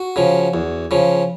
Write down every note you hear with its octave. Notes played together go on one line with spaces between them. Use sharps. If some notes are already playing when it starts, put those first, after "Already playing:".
Already playing: F#4
C#3 F3
E2
C#3 F3